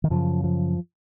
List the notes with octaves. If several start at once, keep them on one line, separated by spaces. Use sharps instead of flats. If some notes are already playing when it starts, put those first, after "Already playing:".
D#3
F#2 C#3 F3
F3